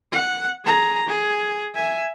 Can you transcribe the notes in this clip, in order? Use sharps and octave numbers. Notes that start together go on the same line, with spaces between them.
F#5
G#4 A#5
G#4
E5 G#5